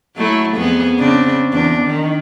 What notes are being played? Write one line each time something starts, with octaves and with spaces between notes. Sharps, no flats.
F#3 A3 E4
F2 B3 G#4
C#3 C4 D4
E2 D4
D#3